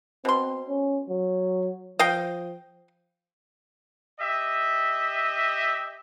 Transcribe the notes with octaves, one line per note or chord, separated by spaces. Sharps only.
B2 C4 C6
C#4
F#3
F3 D#5 F5 G5
G4 D#5 E5